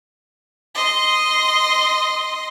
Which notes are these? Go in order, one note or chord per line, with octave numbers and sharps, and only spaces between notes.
D#5 C6